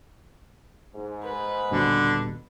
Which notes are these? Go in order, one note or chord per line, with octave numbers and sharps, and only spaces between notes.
G#2
B4
D#1 G2 B2 D3